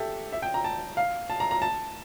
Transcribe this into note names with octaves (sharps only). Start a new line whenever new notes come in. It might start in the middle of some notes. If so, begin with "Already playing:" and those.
Already playing: G4 A4 E5
E5
G5
A#5
A5
F5
A5
A#5
A#5
A5